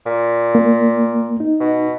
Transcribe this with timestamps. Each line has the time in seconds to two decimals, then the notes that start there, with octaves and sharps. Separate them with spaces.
0.06 A#2
0.55 A#3
1.40 D#4
1.60 B2